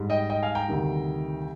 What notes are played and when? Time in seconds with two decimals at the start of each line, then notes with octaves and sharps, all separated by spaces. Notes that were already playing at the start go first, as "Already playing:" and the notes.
Already playing: G#2 G3
0.10 D#5 G5
0.30 D#5 G5
0.43 F5 G#5
0.55 G5 A#5
0.68 D2 C3 D#3 G3